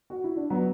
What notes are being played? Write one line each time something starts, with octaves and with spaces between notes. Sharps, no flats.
F#4
E4
D4
F#3 B3